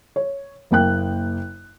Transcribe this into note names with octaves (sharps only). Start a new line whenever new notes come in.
C#5
F#1 A#3 G5 F#6